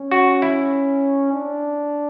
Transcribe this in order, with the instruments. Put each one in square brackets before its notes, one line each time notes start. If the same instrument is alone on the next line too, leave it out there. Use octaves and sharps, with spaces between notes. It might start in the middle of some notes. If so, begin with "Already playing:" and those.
Already playing: [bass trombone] C#4
[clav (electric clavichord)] F#4
E4
[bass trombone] D4